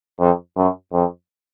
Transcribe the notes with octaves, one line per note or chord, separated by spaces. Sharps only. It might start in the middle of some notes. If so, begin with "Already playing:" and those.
F2
F#2
F2